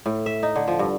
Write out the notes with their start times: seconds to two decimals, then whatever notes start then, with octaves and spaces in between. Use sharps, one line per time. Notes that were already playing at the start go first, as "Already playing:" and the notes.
0.06 A2
0.26 E5
0.43 D#4
0.56 D3
0.68 F3
0.79 G2